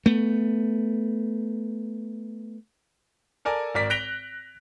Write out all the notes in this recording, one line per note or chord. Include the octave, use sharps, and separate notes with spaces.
A3 B3
A4 A#4 D5 G#5
G#1 A#4 D5 B6
F#6 A#6 B6 D7 F7 G7